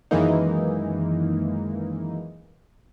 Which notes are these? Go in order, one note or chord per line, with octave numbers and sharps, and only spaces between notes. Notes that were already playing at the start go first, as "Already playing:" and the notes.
F#2 D#3 E3 G#3 A#3 D#4